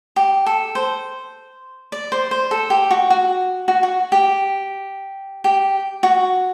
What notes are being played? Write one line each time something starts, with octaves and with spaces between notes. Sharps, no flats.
G4
A4
C5
D5
C5
C5
A4
G4
F#4
F#4
F#4
F#4
G4
G4
F#4